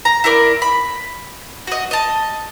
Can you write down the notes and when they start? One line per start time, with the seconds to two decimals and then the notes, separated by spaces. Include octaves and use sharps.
0.05 A#5
0.24 E4 A4 A#4 D5
0.62 B5
1.67 F#4 D#5
1.91 D#5 A5